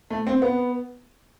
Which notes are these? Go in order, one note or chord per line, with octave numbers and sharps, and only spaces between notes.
A3
C4
B3